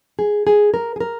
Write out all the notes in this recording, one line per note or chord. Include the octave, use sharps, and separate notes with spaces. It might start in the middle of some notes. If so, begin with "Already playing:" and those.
G#4
G#4
A#4
G#4
A#4